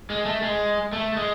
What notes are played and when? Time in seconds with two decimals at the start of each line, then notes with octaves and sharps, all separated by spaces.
0.10 G#3
0.26 A3
0.42 G#3
0.93 A3
1.17 G#3